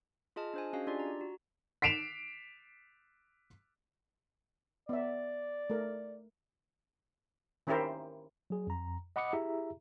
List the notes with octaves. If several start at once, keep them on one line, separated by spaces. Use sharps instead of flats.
F4 G#4 D#5 A5 F6
D4 C5 G#5
C#4 F#4 G#4 D#5 F5 G#5
D4 F4 G4 D5
A#5
F#4
B6 C7 D7 E7 F7
B3 D5 E5
A3 A#4
D#3 C#4 E4 G4 A#4 C5
F#3 G#4
F2 A#5
D#5 F#5 B5 D6 D#6 C#7
E4 G4 G#4 E5 A#5